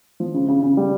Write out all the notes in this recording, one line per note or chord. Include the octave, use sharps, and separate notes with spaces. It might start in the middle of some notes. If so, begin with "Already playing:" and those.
F3
C#3
C#3
C#3
G3